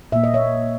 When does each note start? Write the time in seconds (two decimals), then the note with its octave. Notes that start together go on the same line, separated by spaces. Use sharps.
0.12 A#2 A#3 E5
0.24 D#5
0.34 C#5 E5